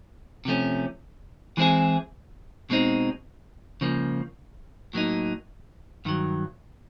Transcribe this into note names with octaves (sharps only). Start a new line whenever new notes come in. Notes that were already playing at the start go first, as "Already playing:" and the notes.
C3 F3 A3 C#4
E3 G#3 C4 E4 G#4
B2 G#3 C4 D#4
C#2 C#3 F3 A#3
A2 F#3 A#3 D#4
G2 D#3 F#3